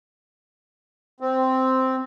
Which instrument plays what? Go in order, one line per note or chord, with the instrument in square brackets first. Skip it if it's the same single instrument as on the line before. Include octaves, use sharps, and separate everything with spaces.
[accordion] C4